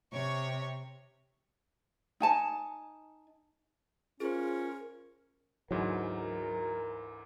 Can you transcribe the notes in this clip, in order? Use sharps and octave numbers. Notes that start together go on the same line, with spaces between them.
C3 C#5 C#6
D#4 G#5 A5
C#4 F4 G#4 A#4 C5
D2 G#2 E3 F#3 A#4